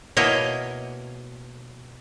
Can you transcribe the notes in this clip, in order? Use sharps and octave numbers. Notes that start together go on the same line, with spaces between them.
B2 A#3 E4 A#4 C#5 D#5